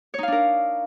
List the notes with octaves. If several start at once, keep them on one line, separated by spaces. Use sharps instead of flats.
D4 D#4 A#4 C#5 F5